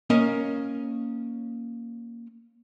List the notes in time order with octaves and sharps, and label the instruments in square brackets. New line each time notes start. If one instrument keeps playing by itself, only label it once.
[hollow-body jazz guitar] A#3 C#4 A#4 D#5